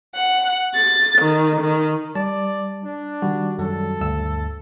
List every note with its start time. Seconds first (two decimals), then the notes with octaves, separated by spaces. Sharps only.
0.14 F#5
0.74 A6
1.22 D#3
1.60 D#3
2.15 G3 D5 A5
2.84 D4
3.22 D#3 G3 F#4
3.59 F#2 F#3 A4
4.01 D2 G2 E6